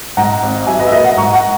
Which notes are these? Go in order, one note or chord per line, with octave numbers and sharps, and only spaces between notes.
G#2 F#5 A#5
G#1
F#3 E5 G#5
B4 D#5
E5
A#3 B4 D#5
D#5 F#5
G#2 A#5 C#6
F#5 A#5